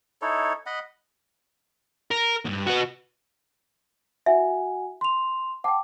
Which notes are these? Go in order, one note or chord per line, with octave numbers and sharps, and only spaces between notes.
D#4 E4 A4 C#5
D#5 F#5 B5
A#4
D2 G2
B3 F#4
E4 F#4 E5 F#5 G#5
C6 F7
F#5 G5 A5 D6